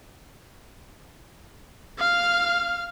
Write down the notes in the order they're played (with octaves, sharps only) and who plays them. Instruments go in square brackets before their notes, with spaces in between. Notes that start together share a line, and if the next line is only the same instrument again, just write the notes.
[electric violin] F5 F6